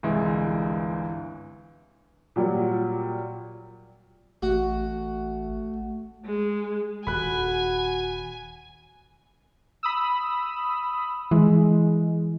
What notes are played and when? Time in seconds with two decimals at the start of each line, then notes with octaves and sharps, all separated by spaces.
0.03 G1 C2 E3 G#3
2.36 A#2 F#3 G3
4.42 A1 A3 F#4
6.26 G#3
7.07 D#1 F#4 G#5 B5 F#6
9.83 B5 D#6 E6
11.31 E3 G#3